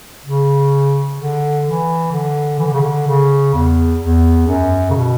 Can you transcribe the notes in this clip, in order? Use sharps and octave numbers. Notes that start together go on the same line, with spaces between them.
C#3
D3
E3
D3
E3
D3
C#3
D3
C#3
E2
E2
F#2
C#3
B2